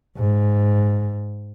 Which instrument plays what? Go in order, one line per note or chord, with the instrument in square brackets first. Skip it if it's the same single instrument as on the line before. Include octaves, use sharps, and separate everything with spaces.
[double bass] G#2